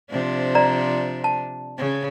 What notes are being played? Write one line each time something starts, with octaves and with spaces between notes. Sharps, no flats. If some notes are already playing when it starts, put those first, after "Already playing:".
C3 F3 D4
D5 A#5
A5
C#3